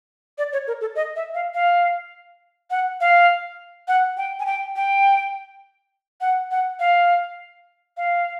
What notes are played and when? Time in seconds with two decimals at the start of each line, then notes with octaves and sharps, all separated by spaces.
0.38 D5
0.53 C#5
0.67 A#4
0.81 A4
0.95 D#5
1.16 E5
1.34 F5
1.54 F5
2.71 F#5
3.01 F5
3.88 F#5
4.17 G5
4.40 G#5
4.46 G5
4.76 G5
6.21 F#5
6.51 F#5
6.80 F5
7.97 F5